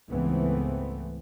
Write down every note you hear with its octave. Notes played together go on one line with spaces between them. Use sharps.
C#2 G#2 E3 A3 B3 C4